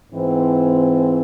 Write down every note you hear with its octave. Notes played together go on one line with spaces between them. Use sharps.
G#2 E3 C4